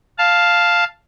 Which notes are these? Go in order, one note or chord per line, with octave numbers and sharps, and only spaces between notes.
F5 A5